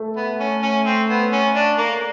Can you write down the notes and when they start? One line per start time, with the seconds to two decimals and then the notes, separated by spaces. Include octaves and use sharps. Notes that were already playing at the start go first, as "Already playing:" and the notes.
Already playing: A3
0.16 B3
0.40 C#4
0.62 C#4
0.86 C4
1.09 B3
1.32 C#4
1.55 D4
1.78 A#3